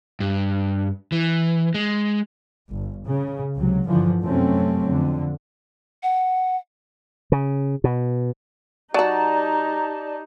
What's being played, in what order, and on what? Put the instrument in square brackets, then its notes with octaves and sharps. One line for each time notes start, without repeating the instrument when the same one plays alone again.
[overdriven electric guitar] G2
E3
G#3
[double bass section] G1
C#3
C#2 C3 F#3
G2 D3 E3 F3
F#2 C3 F#3 A3 C4 C#4
F2 D3
[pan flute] F#5
[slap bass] C#3
B2
[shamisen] F#3 F#4 [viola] D#4 G4 [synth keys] D5 A5 [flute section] A#5